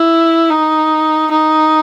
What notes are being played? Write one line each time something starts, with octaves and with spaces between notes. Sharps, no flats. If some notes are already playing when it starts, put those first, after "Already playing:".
Already playing: E4
D#4
D#4